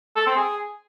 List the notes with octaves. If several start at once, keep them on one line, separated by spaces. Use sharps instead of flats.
A4
C4
G#4